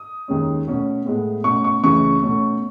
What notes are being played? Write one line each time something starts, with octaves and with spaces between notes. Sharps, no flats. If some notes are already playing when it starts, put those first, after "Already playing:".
Already playing: D#6
D#2 D#3 G#3 C#4
B2 A3 C#4
A2 G#3 B3
B2 A3 C#4 C#6
C#6
C#2 C#3 E3 A3 C#4 C#6
B2 A3 C#4